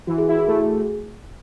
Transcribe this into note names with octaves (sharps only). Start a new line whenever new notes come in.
E3 F#4
G#4
E4 F#4
G#4
A3 F#4
G#4